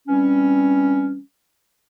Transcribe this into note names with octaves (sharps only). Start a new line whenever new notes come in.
E3 G3 C4 C#4